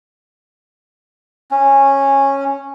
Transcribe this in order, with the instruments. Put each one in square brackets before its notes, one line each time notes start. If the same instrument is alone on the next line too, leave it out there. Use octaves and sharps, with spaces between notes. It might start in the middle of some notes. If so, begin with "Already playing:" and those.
[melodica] C#4